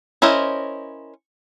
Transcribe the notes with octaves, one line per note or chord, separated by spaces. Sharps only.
C#4 E4 A#4 C5 D#5